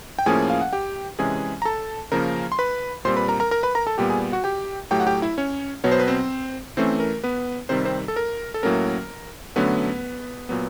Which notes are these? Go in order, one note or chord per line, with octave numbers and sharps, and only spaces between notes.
G5
A2 F3 A#3 C#4 G#4 G#5
F5
F#5
G4 G5
C3 E3 G#3 C#4 G#4 G#5
A#5
A4 A5
C#3 F3 A#3 C#4 A#4 A#5
C6
B4 B5
A#2 G3 C4 C5 C6
B4 B5
A#4 A#5
A#4 A#5
A#4 A#5
B4 B5
A#4 A#5
A4 A5
A#2 G3 B3 G4 G5
G#4 G#5
F#4 F#5
G4 G5
A2 F#3 A3 G4 G5
F#5
G4 G5
E4 E5
C#4 C#5
B2 F#3 B3 C#5
C5
B4
C4 C5
E3 A3 C4 C#4 C5
A#4
B3 B4
C3 D#3 G3 C4 C5
C4 C5
A4
A#4
A4
A2 F#3 A#3 C#4 A#4
D3 F#3 A3 B3 C#4 B4
A#2 F#3 B3